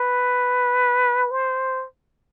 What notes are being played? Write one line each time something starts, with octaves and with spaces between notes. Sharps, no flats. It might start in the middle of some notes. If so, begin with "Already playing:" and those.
Already playing: B4
C5